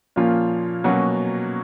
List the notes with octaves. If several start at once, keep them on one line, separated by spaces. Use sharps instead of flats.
A#2 F3 A#3 C#4 F4
B2 F#3 A#3 C#4 F#4